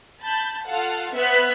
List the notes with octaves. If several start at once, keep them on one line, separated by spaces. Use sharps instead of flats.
A5 B5 G6
F4 A4 F5 F#5
B3 C5 E5 F#6 B6